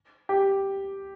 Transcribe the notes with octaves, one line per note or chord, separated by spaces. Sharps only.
G4